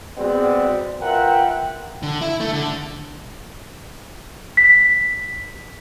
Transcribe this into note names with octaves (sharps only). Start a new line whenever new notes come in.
G#3 B3 C4 F#4 G#4 D5
F4 A#4 B4 E5 F#5 G5
D3
E4
A3
D3
B6